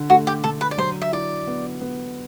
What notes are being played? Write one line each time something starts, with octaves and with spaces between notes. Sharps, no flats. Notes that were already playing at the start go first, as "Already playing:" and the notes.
Already playing: D3
A3 F#4
G4
D3 A4
B4
D5
F#3 C5
E5
E4 D5
B3
B3